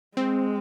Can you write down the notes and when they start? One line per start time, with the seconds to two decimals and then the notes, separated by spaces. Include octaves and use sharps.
0.17 G#3 C4